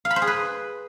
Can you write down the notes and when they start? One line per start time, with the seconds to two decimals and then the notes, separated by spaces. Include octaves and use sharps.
0.05 F5
0.11 B5
0.16 C5
0.22 G#4
0.27 B4